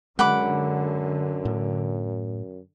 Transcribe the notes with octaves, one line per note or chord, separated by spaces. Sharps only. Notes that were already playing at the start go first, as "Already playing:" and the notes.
F#2 D3 G#3 F#5 B5 D6
A2